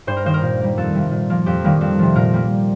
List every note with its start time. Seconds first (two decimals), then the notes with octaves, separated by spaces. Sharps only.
0.07 G2 C5
0.17 A#4
0.25 D#3 A#3 C5
0.34 A#4
0.42 A#2
0.60 G3 A#3
0.77 F2 A4
0.95 C3 G3 A#3
1.11 A#2
1.30 F3 A#3
1.46 F2 G4
1.64 D#3 G3 A#3
1.81 F2
1.99 C3 F3
2.15 A#2 A#4
2.34 G3 A#3